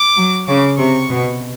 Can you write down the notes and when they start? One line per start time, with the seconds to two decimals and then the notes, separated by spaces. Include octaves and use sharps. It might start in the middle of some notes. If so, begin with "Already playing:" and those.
Already playing: D6
0.17 F#3
0.47 C#3 D6
0.78 C3 C#6
1.09 B2